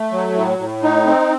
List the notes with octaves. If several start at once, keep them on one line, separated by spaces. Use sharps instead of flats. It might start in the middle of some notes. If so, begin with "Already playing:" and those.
Already playing: A3
F#3
A2
A2
D#4
C4